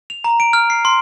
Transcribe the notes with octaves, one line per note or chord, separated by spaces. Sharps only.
F7
A#5
D7
F6
C7
C6